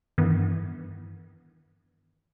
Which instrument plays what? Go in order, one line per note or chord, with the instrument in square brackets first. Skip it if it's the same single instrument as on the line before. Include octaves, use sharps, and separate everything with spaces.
[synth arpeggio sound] G2 D#3 E3 B3